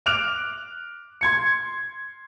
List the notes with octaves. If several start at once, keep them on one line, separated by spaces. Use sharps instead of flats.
D6 F6 F#6 D7 F7
C6 G#6 C#7